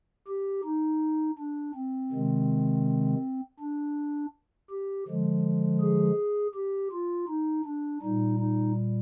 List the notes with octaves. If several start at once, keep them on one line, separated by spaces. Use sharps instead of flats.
G4
D#4
D4
C4
C3 D#3 G#3
D4
G4
D3 F3 G#3
G#4
G4
F4
D#4
D4
A#2 G3 D#4
D#4